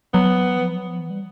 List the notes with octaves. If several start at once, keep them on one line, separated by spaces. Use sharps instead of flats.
F#3 B3
F3
F#3
F3
E3
G3